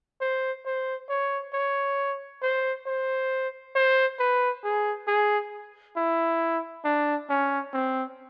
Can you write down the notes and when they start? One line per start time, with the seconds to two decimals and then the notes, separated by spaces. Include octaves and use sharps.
0.21 C5
0.66 C5
1.09 C#5
1.54 C#5
2.42 C5
2.87 C5
3.75 C5
4.19 B4
4.64 G#4
5.07 G#4
5.97 E4
6.85 D4
7.29 C#4
7.73 C4